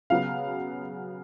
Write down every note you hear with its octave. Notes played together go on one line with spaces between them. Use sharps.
C#3 F#3 B3 F5